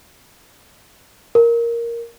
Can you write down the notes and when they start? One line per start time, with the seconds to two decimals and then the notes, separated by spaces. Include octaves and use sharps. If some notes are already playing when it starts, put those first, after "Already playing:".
1.35 A#4